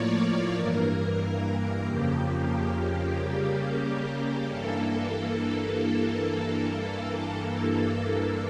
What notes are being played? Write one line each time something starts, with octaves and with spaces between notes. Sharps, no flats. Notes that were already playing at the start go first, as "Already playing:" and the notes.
Already playing: A2 F3 A#3 C#5 D5
C#5
G2 E3 A#3 A#4
F2 C#3 F3 A#3 G4
C#3 G3 A#3 G4
G2 E3 A#3 A4